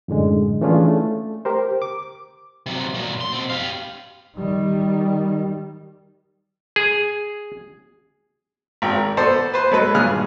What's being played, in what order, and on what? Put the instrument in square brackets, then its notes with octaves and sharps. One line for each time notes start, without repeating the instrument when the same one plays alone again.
[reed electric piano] F#2 A2 D3 G#3
E3 A3 C#4 D4 F4 G#4
A3
G4 A#4 C5
D6
[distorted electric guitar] C3 F#3
A#2 F#3
C6
B2 C4
G4 F5
[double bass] D#3 G3
[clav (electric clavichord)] G#4
[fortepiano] G#1 G5
A#4
B3 A4 C5 D5
B4 C5
F#3 G#3 A4 B4
G2 A#2 G#4 D#6 F6 F#6